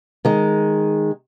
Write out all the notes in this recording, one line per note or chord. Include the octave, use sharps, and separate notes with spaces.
D#3 G#3